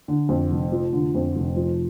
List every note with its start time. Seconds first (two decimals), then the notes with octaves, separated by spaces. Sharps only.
0.08 D3
0.29 F2
0.51 F1
0.72 F3
0.93 D3
1.15 F2
1.36 F1
1.56 F3